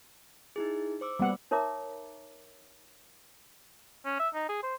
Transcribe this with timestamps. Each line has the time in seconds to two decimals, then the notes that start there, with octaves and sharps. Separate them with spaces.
0.56 D#4 E4 G#4
1.01 C5 D6 E6
1.19 G3 A#3 B3 F#5
1.51 D#4 A#4 C#5 E5 A#5 D6
4.05 C#4
4.20 E5
4.34 D#4
4.49 G#4
4.63 C5